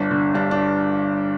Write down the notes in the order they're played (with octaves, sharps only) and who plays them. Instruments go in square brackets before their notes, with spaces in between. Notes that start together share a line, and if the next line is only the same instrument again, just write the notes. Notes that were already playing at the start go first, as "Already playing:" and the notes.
Already playing: [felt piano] G1 D4
D3
G2 D4
D4